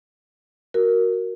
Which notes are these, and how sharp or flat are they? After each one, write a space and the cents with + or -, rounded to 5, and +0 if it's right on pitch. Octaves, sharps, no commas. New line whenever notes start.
F#4 +0 A#4 +0